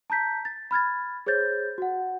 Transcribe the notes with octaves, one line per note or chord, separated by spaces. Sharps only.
A5 A#5 G6 B6
A6
B5 F6 G#6 A6
G#4 C5 C#5 G6 A6
F#4 F#5